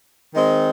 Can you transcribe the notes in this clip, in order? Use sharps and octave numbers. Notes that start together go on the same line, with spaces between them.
D#3 G#3 C4